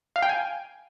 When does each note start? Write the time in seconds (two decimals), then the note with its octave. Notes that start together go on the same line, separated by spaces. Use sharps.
0.16 F5
0.22 G5
0.29 G#5